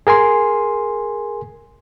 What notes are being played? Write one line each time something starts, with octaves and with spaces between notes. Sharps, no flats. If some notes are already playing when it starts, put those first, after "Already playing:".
G#4 A#4 G#5 C6